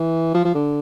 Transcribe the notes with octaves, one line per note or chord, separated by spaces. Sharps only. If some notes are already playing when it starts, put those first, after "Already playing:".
Already playing: E3
F3
F3
D3